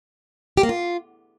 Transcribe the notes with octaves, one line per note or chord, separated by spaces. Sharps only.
G4
A#3
F4